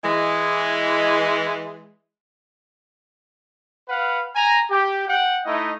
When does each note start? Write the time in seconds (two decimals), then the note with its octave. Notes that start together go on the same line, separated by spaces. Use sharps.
0.04 E3 G#3
3.89 B4 F5 F#5
4.35 G#5 A#5
4.70 G4
5.08 F#5 G5
5.45 A3 D#4 E4 D#5